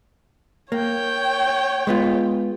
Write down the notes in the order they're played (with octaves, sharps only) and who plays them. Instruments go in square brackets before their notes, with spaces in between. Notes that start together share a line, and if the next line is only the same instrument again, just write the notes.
[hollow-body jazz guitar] A#3 [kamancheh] C#5 G5
[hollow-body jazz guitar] G#3 B3 F4